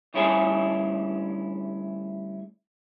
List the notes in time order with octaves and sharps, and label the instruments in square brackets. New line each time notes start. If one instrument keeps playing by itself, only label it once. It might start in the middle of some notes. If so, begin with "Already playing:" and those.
[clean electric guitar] D2 G2 C#4 E4 G#4 G#5